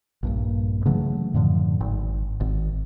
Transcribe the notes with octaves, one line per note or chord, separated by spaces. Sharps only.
A#1 G2 A#2
C#3 E3 F#3 A3
F#2 A2 D3 F3
G#1
G#1